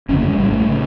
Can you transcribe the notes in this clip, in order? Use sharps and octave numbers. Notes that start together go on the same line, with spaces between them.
G1 F2 C#3 C#4
A#3
G#3
A#1 A2 G3
A3
C#3